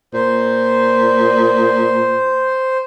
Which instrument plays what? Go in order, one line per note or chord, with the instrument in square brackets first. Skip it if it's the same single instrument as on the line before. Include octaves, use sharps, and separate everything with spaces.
[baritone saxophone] A#2 [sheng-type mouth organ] C5